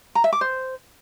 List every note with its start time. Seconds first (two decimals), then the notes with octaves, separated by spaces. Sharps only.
0.15 A#5
0.24 E5
0.33 D6
0.41 C5